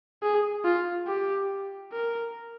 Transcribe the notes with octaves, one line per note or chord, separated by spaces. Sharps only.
G#4
F4
G4
A#4